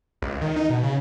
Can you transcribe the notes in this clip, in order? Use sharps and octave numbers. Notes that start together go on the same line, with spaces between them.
C#2
D#3
D#4
B2
C#3